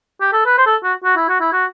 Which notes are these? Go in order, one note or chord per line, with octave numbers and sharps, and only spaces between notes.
G4
A4
B4
C5
A4
F#4
F#4
E4
F#4
E4
F#4